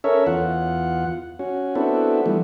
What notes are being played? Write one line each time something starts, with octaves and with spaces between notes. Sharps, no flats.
C#4 A4 A#4 C#5 E5
E2 F4 F#5
C#4 F#4
B3 C4 D4 E4 F#4 A4
E3 F3 G3 A3 B3